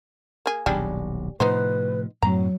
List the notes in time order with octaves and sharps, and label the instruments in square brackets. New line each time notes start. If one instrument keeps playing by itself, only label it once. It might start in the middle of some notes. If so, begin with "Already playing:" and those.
[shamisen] A#3 G#4
[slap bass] D#1 B1 F#3 [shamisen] G3 D4 G#4
[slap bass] A2 C3 F3 [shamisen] B3 D#4 C5 [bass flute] B4
[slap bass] F#2 A2 C4 [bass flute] F#3 [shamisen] A#5